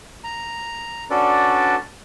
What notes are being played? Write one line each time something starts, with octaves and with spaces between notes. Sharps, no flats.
A#5
C#4 D4 F#4 A4 B4 D5